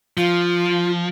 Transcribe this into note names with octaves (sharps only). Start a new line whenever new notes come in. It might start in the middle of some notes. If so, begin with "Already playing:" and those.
F3 F4